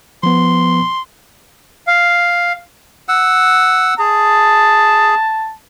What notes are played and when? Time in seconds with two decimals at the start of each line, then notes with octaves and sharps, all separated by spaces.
0.23 F3 B3 C6
1.87 F5
3.09 F#5 E6
3.99 G#4 A5